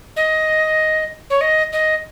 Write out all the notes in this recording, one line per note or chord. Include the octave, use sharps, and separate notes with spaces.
D#5
C#5
D#5
D#5